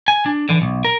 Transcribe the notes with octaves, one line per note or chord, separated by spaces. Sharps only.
G#5
D4
D3 E3
B1
A#4